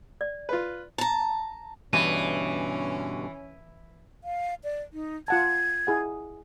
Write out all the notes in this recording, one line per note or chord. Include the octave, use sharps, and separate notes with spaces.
D5
F4 B4
A5 A#5
G2 B2 D3 E3 C#4 D#7
F5
D5
D#4
F4 F#5 A5 G#6
E4 G#4 F#5